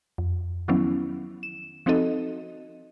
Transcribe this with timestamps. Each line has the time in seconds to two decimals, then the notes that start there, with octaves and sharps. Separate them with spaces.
0.18 F2
0.68 D#3 F3 F#3 B3 C#4 E4
1.43 E7
1.86 F3 C4 D#4 F#4 A4 D#5